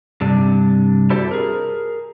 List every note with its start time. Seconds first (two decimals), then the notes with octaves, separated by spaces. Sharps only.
0.21 G2 C3 D4
1.10 E4 F#4 G4 A4 C5 D5
1.31 G#4 A#4